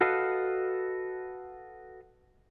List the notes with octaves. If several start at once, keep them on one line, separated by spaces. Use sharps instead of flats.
F#4 A4 B4 D#5 F5